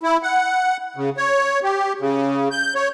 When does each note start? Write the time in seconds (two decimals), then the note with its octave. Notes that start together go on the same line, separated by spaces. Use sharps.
0.03 E4
0.23 F#5
0.97 C#3
1.17 C#5
1.63 G4
2.00 C#3
2.51 G6
2.75 C#5